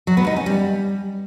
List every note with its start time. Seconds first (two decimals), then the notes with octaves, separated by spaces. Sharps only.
0.07 F#3
0.17 B3
0.27 D#4
0.36 C#4
0.46 G3